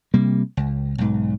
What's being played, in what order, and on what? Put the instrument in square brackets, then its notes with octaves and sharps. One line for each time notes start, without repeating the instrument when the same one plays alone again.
[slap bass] C3 G3 A#3
C#2
B1 G#2